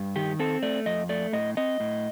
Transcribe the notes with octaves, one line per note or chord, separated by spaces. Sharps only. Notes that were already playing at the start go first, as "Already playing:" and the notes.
Already playing: G2
D#3 G4
C4 A4
A3 D5
F2 D#5
A3 D5
A2 D#5
C4 D#5
A2